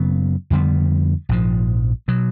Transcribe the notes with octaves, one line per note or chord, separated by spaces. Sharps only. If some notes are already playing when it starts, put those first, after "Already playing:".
Already playing: F#2 C#3 F#3 B3
F2 D3 G3 B3
A#1 G#2 F3
B2 F#3